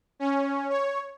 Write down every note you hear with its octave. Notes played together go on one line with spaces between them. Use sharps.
C#4
C#5